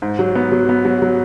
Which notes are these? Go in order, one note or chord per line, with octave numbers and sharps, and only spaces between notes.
G#2
F#3
B3
F#3
B3
F#3
F#3